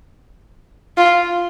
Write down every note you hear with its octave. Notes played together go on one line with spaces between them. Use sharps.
F4